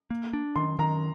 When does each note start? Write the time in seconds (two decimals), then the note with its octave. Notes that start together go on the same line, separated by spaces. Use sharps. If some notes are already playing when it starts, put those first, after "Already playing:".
0.10 A#3
0.33 D4
0.56 D#3 C6
0.79 D#3 A#5